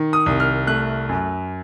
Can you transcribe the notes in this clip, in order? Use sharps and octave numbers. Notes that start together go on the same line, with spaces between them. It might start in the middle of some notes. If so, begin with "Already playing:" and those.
Already playing: D#3
D#6
C2
F6
A3 F#6
F#2